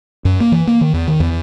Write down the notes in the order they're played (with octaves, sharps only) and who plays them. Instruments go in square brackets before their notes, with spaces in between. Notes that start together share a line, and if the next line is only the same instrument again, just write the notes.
[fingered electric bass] F#2
A#3
E3
A#3
D#3
E2
D#3
E2